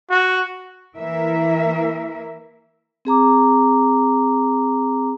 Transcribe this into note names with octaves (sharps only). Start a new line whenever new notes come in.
F#4
E3 A#3 E4 A#4 E5
C4 G#4 A#5 D6